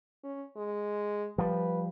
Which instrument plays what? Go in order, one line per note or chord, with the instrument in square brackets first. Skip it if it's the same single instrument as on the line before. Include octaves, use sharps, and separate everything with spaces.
[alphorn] C#4
G#3
[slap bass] F3 G3 [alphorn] B4